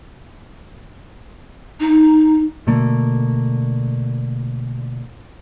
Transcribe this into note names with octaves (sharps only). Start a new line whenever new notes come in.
D#4
B2 D3 A3 A#3